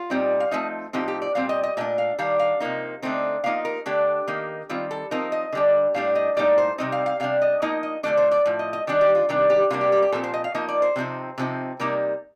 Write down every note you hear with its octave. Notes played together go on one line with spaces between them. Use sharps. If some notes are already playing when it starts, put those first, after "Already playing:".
Already playing: F4
A#2 G3 C4 D#4
F5
F3 A3 C4 D#4 D#5
A2 F3 C4 D#4 G4
G4
D5
A#2 G3 C4 F5
D#5
D#5
A#2 A3 D4 D#5
F5
D#3 G3 D4 F5
F5
C3 F3 A#3 D#4
D3 A3 C4 D#4
F3 A#3 D#4 F5
A#4
D3 A3 D4 G4
D#3 A#3 D#4
D#3 G3 C4 F4
A4
F3 C4 D#4 A#4
D#5
D3 G3 D4
A2 G3 D4 F5
D#5
A2 G3 A#3 D#4 D5
C5
C3 G3 C4 D#4 D#5
F5
F5
C3 G3 D4 F5
D#5
F3 A#3 D#4 D#5
D#5
D3 F3 A3 D4 D5
C5
D5
A2 F3
D#5
D#5
D#3 G3 D4 D5
G4
F4
C3 D#3 G3 D4 G4
G4
C3 G3 A#3 D4 F4
G4
G4
G4
A#2 F3 C4 A4
C5
D#5
F5
F3 A#3 D#4 D#5
D5
C5
C3 F3 C4 D#4
C3 F3 C4 D#4
C3 G3 A#3 D#4 A#4